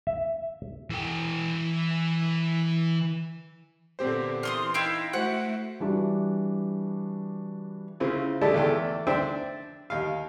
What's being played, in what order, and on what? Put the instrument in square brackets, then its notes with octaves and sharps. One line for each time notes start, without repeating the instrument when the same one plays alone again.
[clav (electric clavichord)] E5
[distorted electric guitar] E3 G5
[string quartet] A#2 D3 B3 [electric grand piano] C4 G4 C5
[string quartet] E3 [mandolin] F4 C6 D#6
[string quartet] D#4 [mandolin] E4 F5 G5
[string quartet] A3 E4 [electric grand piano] F#4 C5 [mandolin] F#5
[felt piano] E3 G3 D4 F#4
[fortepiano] C#3 C4 E4 F4
G#3 A3 E4 G4 D5 A5
E2 A3 D5 G5
D4 C5 D5 E5 G5
D#2 F5